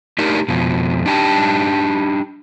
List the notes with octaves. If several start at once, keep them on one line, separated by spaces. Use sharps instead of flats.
A3 D4 D#4 G4 A#4
F2 B2
D4 D#4 G4 G#5 A5